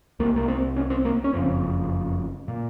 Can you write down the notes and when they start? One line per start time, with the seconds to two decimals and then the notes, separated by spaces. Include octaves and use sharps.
0.19 C2 A#3
0.24 C3
0.36 A#3
0.48 C4
0.76 C#4
0.90 C4
1.05 A#3
1.24 C#4
1.33 F#1 F2 C#3 C4
2.48 A#2